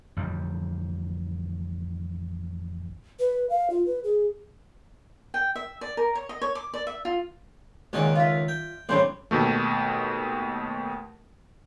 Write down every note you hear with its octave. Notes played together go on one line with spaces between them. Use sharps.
A1 F2 D3 G3
B4
F5
F4
B4
G#4
G5
E5
D5
A#4
C#5
D#5
C#5
D6
D5
E5
F4
C#2 A#2 D#3 G#4 D5 F#5
F4 E5
G5
A1 G2 C#3 C4 D4 E4
D#2 B2 A3